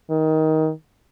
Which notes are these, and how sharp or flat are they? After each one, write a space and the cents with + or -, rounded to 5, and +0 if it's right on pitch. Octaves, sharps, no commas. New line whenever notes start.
D#3 +20